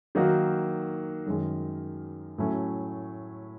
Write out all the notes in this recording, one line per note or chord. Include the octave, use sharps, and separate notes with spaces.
D#3 F#3 A#3 D#4 F#4
F#2 D#3 G#3
A2 F#3 A3 C#4